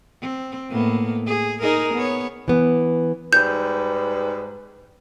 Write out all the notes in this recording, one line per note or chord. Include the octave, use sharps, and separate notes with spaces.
C4
A2 A#3 B3
G#4
D#4 G#4 A#4
B3 C#5
E3 B3
G#2 G3 B4 G6